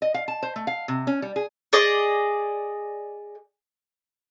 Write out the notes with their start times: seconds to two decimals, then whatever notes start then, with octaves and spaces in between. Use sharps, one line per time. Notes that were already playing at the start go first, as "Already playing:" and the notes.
0.02 D#5
0.14 F5
0.28 A5
0.43 C5
0.56 A3
0.67 F5
0.88 C3
1.07 C#4
1.22 G3
1.36 G#4
1.73 G#4 D5 D#5